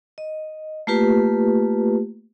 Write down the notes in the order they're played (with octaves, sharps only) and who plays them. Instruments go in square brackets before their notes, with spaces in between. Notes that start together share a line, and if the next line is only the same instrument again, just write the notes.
[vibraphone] D#5
A3 A#3 F4 G4 B4